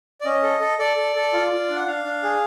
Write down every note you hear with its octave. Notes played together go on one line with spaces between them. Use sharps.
D5
C#4 D#5
A4
A4
A4 D5
A4
A4
F4
F4
D4
F#5
D4 F5
D4
G#4